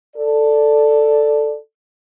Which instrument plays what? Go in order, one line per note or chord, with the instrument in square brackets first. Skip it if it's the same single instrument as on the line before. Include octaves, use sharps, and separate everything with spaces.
[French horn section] A4 D5